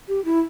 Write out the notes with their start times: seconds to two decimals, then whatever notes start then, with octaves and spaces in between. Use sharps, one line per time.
0.08 G4
0.25 E4